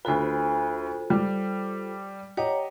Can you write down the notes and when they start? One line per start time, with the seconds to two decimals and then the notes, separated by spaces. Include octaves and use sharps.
0.05 D2 F4 A4 B4 C5
1.10 G3
2.37 G4 C#5 D#5 F#5 A#5